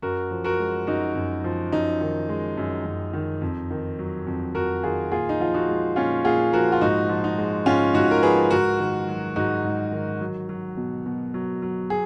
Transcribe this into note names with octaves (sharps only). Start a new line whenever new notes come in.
F#2 F#4 A#4
F3
F#4 A#4
G#3
F#2 D#4 F#4
F#2
F3
F#2 D#4
D#3
G#3
F#2
F#2
D#3
F2
D#3
F#3
F2
F2 F#4 A#4
D#3 F4 G#4
A#2 F4 G#4
D#4
F3 F4
D#4 F#4
G#3
A#2 C#4 F4
A#2 F4 G#4
F3 F#4 A#4
F4
G#2 D#4 F#4
F3
D#4
G#3
G#2 C#4 F4
G#2 D#4 F#4
A#4
F3 G#4 B4
G#2 F#4 A#4
D#3
F#3
G#2 D#4 F#4
G#2
D#3
F#3
F#3
B2
B2
F#3
F#3
F#3 G#4